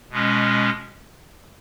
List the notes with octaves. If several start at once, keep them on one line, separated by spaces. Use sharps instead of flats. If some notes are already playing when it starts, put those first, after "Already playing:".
B2 G#3 C#4